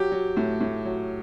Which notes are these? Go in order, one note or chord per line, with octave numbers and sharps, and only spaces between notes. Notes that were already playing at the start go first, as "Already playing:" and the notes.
Already playing: F#3 G4
F#3
A2
A2
F#3